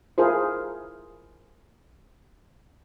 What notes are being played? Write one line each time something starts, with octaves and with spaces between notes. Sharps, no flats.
E4 F4 G#4 A#4 C5